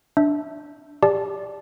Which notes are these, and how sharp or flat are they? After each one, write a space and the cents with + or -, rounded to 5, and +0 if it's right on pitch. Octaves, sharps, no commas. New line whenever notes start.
D4 +0 E5 -25
G4 +25 D5 +0 A5 -25